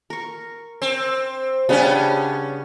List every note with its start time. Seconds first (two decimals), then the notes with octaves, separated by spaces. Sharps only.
0.10 A#4 C#6
0.82 C4
1.69 C#3 G3 B3 C#4 D4